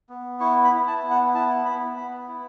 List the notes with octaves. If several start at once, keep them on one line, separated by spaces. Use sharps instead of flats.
B3
E4 C#6
B5
E4
A5
B3
F#5
E4 A5
B3 B5
B3 B5
E4